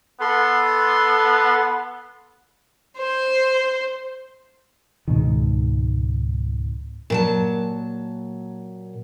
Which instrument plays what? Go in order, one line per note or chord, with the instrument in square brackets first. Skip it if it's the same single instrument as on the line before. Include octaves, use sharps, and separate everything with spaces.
[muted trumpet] B3 [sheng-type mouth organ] A4 C6
[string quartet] C5
[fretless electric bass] C#2 G#2 B2 D#3
[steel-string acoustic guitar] A#2 F#3 A5